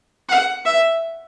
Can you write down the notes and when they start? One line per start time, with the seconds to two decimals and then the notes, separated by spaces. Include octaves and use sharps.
0.29 F#5
0.65 E5